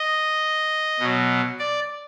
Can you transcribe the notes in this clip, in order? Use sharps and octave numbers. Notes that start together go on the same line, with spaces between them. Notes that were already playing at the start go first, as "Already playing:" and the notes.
Already playing: D#5
B2 F#3
D5